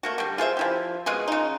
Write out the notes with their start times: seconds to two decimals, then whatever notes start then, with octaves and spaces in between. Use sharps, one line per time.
0.03 A3 A#3 F#4
0.18 D3 G3
0.38 F4 G#4 C5 E5
0.57 F3 E4 G4
1.06 B2 G#3 F4 G#4
1.28 C#3 D#4